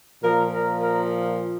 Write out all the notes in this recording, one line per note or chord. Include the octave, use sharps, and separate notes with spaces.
A#2 F3 A#4
A#4
A#4